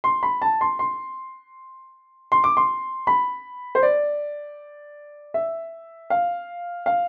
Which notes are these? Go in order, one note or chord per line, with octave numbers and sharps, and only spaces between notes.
C6
B5
A5
C6
C6
C6
D6
C6
B5
C5
D5
E5
F5
F5